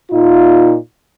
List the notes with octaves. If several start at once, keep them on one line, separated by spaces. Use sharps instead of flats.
A#2 D#4 F4